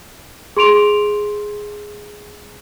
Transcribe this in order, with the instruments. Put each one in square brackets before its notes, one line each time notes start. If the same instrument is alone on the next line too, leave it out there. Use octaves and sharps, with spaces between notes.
[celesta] G#4 C6 D7 F7